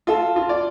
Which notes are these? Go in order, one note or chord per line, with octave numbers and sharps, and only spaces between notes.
F4 A4 F5 A5
F4
D5